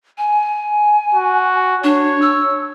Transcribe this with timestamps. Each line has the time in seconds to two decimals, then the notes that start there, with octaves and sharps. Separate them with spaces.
0.18 G#5
1.15 F#4
1.84 D4 C#5
2.22 E6